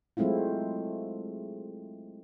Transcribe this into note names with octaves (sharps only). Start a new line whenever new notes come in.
F#3 G#3 A3 C4 E4 F4